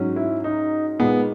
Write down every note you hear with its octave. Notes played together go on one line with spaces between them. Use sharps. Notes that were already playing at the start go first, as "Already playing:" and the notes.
Already playing: G#2 F#3 C#4
E4
D#4
A#2 G#3 B3 D#4 G#4